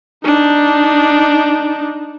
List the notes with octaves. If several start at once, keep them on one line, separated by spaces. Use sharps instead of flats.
D4 D#4